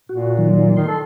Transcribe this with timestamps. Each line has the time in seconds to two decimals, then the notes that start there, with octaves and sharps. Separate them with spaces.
0.09 A#2 F#4
0.38 D#3 F#3
0.76 D#3 C6
0.88 A4